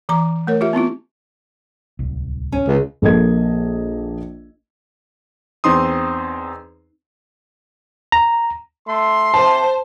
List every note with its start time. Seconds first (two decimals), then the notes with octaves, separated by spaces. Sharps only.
0.09 E3 A#5 D6
0.47 A3 A#4 C#5
0.61 F4 G4 E5
0.73 B3 C4 E4 F4
1.99 D1 C2
2.52 C#4
2.68 C#2
3.02 A#1 A#3 A4 D#5 G#6
5.64 E2 C4 D#4 C6 D#6
8.12 A#5
8.87 A3 C6
9.34 C3 C5 A5